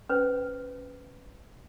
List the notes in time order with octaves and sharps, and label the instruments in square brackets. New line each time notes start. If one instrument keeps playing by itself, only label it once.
[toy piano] C#4 B4 C5 G5